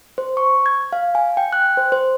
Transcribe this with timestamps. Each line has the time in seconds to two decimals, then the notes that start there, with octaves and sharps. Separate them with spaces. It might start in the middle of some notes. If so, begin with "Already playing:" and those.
0.18 C5
0.37 C#6
0.66 G#6
0.93 F5
1.15 G#5
1.37 G5
1.53 F#6
1.77 C5
1.92 C5